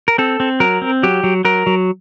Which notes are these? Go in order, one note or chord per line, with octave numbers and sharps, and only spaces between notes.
A#4
C4 A4
C4
F#3 A#4
C4
F#3 G4
F#3
F#3 A#4
F#3